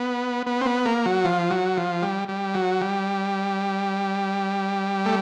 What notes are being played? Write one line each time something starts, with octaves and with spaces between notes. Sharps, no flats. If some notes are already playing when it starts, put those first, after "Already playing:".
Already playing: B3
B3
C4
B3
A#3
F#3
F3
F#3
F3
G3
G3
F#3
G3
A3